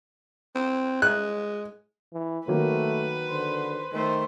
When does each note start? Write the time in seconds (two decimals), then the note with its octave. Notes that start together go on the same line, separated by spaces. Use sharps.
0.55 C4
1.02 G#3 F#6
2.13 E3
2.48 D#3 F#3 A3 A#3 B4
3.29 D3 C5
3.92 D#3 A3 C5